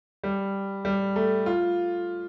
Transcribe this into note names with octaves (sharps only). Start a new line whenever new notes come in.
G3
G3
A3
F4